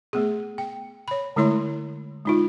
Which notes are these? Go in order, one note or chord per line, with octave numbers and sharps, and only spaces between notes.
A3 B3 G#4
G5
C#5 B5
D3 G#3 A3 E4 C#5 C6
G#3 D#4 F4